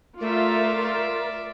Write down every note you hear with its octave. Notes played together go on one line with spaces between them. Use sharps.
A3 F4 A#4 D5 E5